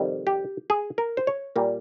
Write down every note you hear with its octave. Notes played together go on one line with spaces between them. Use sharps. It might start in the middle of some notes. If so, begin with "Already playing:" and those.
Already playing: F2 C3 D#3 G3
G4
G#4
A#4
C5
C#5
A#2 G3 A#3